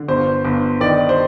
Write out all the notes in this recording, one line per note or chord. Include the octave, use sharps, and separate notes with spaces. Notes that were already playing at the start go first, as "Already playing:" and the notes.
Already playing: D3
G1 C5
G1
D#3 D5
C5